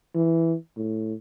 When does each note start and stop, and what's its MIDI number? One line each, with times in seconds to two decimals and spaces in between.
0.15 0.54 52
0.77 1.14 45